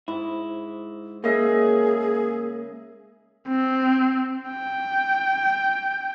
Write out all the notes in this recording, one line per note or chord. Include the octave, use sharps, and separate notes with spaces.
G#2 E4
C#3 A#3 G#4 D#5 E5
C4
G5